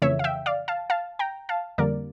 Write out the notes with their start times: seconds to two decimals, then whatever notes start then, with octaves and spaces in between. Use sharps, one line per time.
0.02 F2 C#3 E3 A3 C#5 E5
0.19 F5
0.24 E5 G5
0.46 D5 F5
0.68 F5 A5
0.90 F5 A5
1.19 G5 A#5
1.49 F5 A5
1.78 F2 D3 G3 A#3 A#4 D5